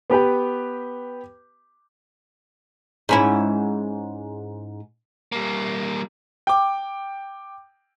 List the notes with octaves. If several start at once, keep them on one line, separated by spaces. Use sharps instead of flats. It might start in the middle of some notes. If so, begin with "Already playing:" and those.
B3 G4 B4 G5
G#2 C#4 E4
G3 A#3
G5 D6